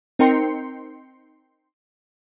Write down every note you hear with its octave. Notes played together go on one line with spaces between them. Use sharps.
C4 D#4 A#4 G5 C6 C#7